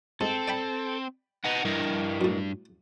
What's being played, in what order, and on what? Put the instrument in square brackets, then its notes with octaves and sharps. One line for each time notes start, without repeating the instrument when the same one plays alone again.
[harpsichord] G#2 [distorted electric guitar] C4 [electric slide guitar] A4
[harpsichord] D5 G5 B5
[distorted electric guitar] D#4 [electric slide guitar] B4 D#5 F#5
[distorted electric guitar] G2 [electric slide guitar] E4 A#4 D#5
[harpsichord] F#2 A2